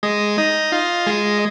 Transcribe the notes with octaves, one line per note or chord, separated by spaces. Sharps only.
G#3 D#5
D#4
F4
G#3